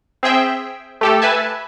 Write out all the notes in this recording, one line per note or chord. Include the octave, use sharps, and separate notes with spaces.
C4 G#4 E5 G5
A3 G4 A4
B4 E5 G#5 A5